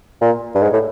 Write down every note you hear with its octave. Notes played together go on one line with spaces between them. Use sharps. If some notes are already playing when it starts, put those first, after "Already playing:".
A#2
G2
G#2
A2